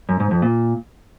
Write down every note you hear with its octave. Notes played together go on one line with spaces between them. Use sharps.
F#2
G#2
F2
A#2